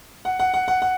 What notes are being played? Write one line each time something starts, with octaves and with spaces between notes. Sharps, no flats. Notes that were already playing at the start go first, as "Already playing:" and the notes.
F#5
F#5
F#5
F#5
F#5